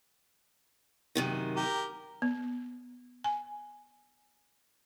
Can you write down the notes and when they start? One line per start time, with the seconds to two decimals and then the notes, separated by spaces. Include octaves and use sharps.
1.15 F#2 C3 D#3
1.56 G4 A#4
2.22 B3
3.24 G#5